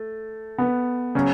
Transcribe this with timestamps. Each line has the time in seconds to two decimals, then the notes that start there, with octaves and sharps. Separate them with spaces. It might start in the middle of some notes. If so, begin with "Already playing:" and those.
Already playing: A3
0.59 B3
1.15 C#3 F#3 C#4